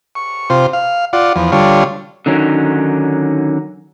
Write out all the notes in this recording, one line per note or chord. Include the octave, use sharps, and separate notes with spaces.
C#6
C3 F4 C5
F5
F4 D5 F#5
E2 F3
D3 G3 F4 C#5
D3 D#3 F#3 C#4 D#4